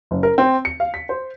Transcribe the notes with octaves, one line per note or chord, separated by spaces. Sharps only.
F#1
A#4
C4
C#7
F5
B6
C5